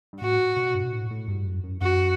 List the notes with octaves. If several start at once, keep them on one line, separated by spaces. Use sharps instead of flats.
G2
A2 F#4
B2
G2
B2
A2
A2
G2
F#2
F#2
F#2 F#4